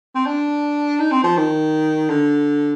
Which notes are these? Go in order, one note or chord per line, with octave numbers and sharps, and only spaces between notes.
C4
D4
D#4
C4
F3
D#3
D3